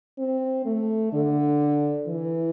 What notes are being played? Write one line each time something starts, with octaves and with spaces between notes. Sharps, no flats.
C4
A3
D3
E3